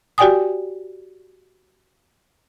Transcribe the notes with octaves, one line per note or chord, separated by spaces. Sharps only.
F#4 G4 D5 G5 G#5 D#6